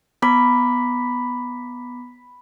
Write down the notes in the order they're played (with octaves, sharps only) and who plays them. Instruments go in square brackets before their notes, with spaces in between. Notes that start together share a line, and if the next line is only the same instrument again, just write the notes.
[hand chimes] B3 A#5 D6 [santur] B5